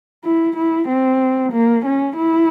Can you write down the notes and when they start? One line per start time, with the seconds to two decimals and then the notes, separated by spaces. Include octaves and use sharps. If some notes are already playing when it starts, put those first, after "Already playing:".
0.24 E4
0.56 E4
0.88 C4
1.52 A#3
1.85 C#4
2.16 E4